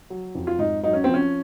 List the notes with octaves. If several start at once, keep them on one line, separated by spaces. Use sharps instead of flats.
F#3
F2
F4
G#2 D#4
F#3 D#4
C#4
F3 C4
C#4